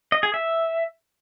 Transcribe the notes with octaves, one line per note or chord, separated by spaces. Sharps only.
D#5
G#4
E5